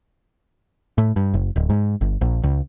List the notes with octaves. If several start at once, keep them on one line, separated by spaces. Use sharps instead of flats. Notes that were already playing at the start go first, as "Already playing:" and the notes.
A2
G2
F#1
D1
G#2
G1
A#1
C#2